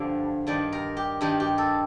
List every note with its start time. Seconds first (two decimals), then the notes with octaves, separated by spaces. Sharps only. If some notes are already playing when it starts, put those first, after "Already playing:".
Already playing: G2 D3 F3 D5
0.47 G2 D#3 G3 D5
0.72 A#4
0.97 G4
1.21 G2 D#3 G3 G4
1.40 G4
1.58 A4